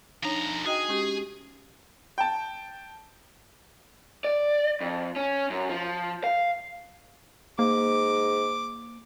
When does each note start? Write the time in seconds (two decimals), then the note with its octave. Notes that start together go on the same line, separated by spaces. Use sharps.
0.23 F2 D4 D#4 C#5 A#5
0.66 F#4 G#4 D#5 G5
0.88 G#3 C#4 G4
2.18 G5 A5
4.24 D5
4.81 F2
5.16 C#4
5.50 F#2
5.69 F3
6.24 F5
7.59 G#2 A#3 D6